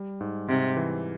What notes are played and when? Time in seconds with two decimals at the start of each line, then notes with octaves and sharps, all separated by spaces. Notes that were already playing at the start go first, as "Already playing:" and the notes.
Already playing: G3
0.21 G#2
0.48 G#2 C3
0.76 E3